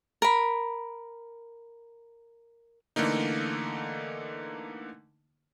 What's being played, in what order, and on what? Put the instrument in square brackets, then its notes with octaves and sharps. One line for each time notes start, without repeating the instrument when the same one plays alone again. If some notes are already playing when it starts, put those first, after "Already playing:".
[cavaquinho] A#4 B5
[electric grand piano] D3 E3 A3 A#3 D#4